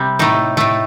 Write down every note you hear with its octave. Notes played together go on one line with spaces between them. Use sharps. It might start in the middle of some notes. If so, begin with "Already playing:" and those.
Already playing: C3 G3 G4
A2 A3 D#4
A2 A3